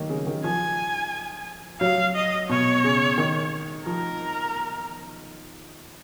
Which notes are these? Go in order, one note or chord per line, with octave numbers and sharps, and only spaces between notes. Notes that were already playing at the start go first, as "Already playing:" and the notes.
Already playing: D#3 F#3 A#3
C#3
D#3
F3 G#5
F#3 F5
D#5
B2 C#5
C#3
D#3
F3 A#4